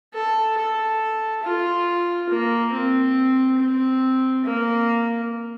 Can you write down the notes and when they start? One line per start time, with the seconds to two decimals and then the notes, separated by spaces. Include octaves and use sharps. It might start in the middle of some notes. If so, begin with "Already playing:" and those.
0.14 A4
0.57 A4
1.43 F4
2.29 A#3
2.72 C4
3.58 C4
4.45 A#3